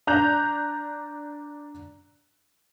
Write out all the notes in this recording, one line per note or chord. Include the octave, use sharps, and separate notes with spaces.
D4 A#5 F#6 G6 F7